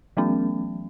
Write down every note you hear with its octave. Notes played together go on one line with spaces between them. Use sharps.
E3 F#3 A3 B3 C#4